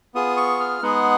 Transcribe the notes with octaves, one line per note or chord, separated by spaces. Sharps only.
B3 F4 G#4 D#6
C#6
F6
G#3 B3 D#4 G#4 F#5